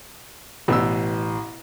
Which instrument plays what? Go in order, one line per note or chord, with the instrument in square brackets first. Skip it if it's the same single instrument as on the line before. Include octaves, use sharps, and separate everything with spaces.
[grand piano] A1 [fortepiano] B2 E6